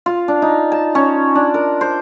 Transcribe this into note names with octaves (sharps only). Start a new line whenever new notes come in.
F4
D4
D#4
A5
C#4
D4
A#4
C5